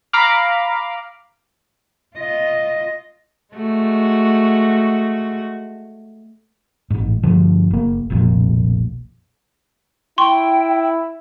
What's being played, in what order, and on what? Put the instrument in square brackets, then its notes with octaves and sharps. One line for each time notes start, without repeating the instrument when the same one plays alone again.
[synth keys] F5 A#5 B5 D6 F6
[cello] F4 D#5
[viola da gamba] G#3 A3 F#4
[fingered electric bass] A1 G#2
G2 D3 F3
F#1 A#3
F1 B1 F2 A#2
[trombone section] E4 [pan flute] G5 [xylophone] C6 C#6